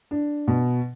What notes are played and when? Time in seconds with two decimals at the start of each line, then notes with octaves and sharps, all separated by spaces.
0.11 D4
0.48 B2